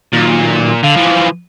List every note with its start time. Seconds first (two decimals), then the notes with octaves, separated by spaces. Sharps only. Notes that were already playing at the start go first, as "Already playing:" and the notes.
0.13 A#2 D#3 F#3
0.84 D3 F5
0.97 E3 F3